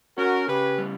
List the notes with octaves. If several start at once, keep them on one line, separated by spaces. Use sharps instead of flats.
C#4 F#4 A#4
C#3 G4 B4
G3